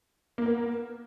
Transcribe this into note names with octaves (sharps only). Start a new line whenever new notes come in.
A#3 B3 A#4